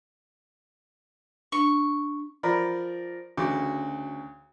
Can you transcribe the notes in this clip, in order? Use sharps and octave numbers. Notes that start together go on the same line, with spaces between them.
D4 C#6
F3 A#4 D5 B5
D2 C#3 F#4 D6